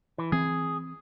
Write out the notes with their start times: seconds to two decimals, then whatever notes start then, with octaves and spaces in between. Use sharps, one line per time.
0.18 E3
0.32 E3 C4 G#4